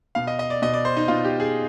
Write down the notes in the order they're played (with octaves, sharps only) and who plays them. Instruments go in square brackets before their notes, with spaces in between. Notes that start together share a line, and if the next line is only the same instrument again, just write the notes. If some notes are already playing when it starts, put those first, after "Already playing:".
[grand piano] B2 F5
D#5
D#5
D5
B2 D#5
D5
C5
D#4
B2 F4
G4
G#4